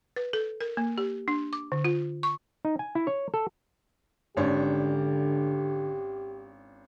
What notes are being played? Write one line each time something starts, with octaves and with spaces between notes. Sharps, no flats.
B4
A4
A#4
A#3
G4
D4
D6
D3
F4
C#6
D#4
G#5
E4
C#5
A4
G#1 D3 C#4 D4 G4